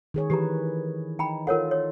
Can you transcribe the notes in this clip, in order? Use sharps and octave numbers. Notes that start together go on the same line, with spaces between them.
D#3 G#4 C#5
D#3 E3 G4 B4 A#5
D#4 G5 A#5 B5
F4 A4 A#4 C#5 F#5
C#5